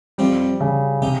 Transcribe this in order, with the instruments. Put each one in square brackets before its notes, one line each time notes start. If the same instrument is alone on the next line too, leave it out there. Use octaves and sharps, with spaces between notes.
[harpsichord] F2 C3 F3 C4 [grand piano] G3
[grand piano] C#3
[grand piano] C3 [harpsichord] D#4 G4